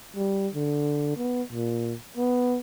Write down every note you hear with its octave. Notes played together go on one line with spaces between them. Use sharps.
G3
D3
B3
A#2
B3